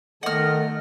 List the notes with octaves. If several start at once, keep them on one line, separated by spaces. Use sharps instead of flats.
D#3 A3 D#5 F#5 F6